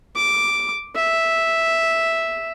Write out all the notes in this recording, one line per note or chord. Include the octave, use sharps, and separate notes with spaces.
D6
E5